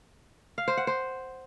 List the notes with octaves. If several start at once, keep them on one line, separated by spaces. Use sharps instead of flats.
F5
C5
F#5
C5